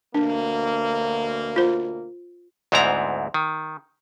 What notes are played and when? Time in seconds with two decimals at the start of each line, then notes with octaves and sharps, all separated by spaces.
0.14 D2 B2 A#3 D4
1.56 F4 C5
2.72 D2 G#2 B3 C4 E4 A#5
3.34 D#3